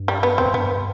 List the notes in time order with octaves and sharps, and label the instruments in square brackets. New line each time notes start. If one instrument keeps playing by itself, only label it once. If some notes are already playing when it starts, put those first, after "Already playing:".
Already playing: [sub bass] G2
[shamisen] G3
B3
[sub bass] E2 [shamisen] C4
[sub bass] F#2
[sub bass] G2 [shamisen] B3